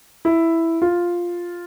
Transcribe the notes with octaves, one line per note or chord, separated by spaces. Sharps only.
E4
F4